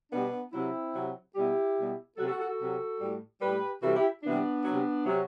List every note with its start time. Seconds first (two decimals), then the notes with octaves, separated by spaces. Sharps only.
0.11 B2 G3 B3 D4
0.53 C3 F#3 C4 E4
0.94 C3 F#3
1.35 B2 G3 E4 G4
1.76 B2 G3
2.17 C3 F#3 F#4 A4
2.28 F#4 A4
2.38 F#4 A4
2.49 F#4 A4
2.59 C3 F#3
3.00 A2 G3
3.41 A2 G3 G4 B4
3.82 C3 E3 G3 F#4 A4
3.96 E4 G4
4.23 C3 E3 G3 B3 D4
4.65 C3 F#3
5.06 C3 F#3